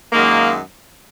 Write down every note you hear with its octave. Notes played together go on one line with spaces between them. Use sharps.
F#2 D#3 G#3 A#3